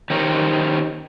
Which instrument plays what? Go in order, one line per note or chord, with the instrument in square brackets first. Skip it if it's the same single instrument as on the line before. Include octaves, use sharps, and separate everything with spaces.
[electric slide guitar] D#3 C#4 G4 A#4 C5 C#5